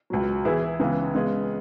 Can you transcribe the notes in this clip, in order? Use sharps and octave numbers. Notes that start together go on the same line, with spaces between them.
C#2 B2 F#3
E3 B3 E4 G#4 B4
C#2 C#3 E3 B3
C#3 G#3 B3